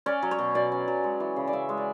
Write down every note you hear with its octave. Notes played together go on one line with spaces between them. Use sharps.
C#4 D5
F#3
C#5
B2
B2 D5
C#4
F#3
G#3
E3
C#3
D5
C#3 E5
G#3
D5